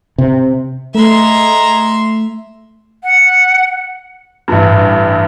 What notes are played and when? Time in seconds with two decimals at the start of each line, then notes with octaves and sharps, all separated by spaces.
0.18 C3
0.95 G#3 A3 E5 A#5 C6
3.03 F#5
4.48 A1 G2